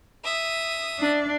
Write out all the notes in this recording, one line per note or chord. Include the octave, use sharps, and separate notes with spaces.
E5 D#6
D4